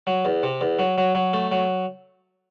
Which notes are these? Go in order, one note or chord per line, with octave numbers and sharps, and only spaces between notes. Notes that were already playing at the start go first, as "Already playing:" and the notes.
F#3
E2
C3
E2
F#3
F#3
F#3
A3
F#3